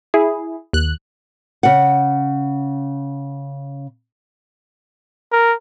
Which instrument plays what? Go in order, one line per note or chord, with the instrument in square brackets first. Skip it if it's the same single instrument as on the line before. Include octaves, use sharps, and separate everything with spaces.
[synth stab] E4 G#4
D#2 F#6
[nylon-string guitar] C#3 F#5
[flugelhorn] A#4